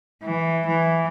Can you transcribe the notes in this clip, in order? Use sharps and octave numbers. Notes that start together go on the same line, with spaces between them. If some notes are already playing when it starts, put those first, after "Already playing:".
E3
E3